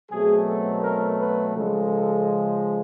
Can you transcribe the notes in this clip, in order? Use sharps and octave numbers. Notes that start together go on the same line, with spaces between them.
B2 F#3 A3 C4 G#4
A4
A#4
B4
C#3 F3 G#3 A4